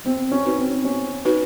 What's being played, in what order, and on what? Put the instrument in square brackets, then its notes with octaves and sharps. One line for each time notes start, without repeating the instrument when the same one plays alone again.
[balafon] B3 [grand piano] C4
[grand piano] C#4
[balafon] D#4 F#4 B4
[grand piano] C4
[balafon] B3 [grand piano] C#4
[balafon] D#4 F#4 B4